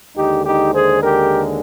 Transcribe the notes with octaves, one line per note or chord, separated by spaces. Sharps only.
D#2 D3 G#3 D#4 G4
D#4 G4
G#4 C5
G4 A#4